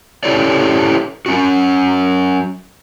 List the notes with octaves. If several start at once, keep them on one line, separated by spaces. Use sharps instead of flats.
C#4 E4 G4 A4 C#5 D5
F#3 C#4 F#4